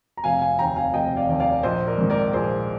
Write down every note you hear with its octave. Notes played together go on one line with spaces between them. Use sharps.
A#5
F1 F5 G#5
F5 G#5
D#2 D#3 G5 A#5
F5 G#5
F1 D#5 G5
D5 F5
D#2 D#3
D5 F5
A#1 C5 D#5
A#4 D5
G#2 D#3 G#3
A#4 D5
A#1 G#4 C5